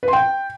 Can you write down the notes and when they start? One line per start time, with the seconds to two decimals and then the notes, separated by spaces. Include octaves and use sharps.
0.03 B4
0.08 C6
0.13 G5